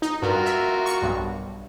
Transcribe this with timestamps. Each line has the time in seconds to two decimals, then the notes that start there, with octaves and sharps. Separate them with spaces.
0.02 D#4
0.22 G2 F4 F#4 A#4
0.46 E5
0.86 C#6 C#7
1.02 B1 G2